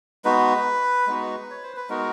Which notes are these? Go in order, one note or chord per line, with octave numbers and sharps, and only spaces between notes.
G#3 B3 D#4 F#4 B4
G#3 B3 D#4 F#4
C#5
C5
B4
G#3 B3 D#4 F#4 A#4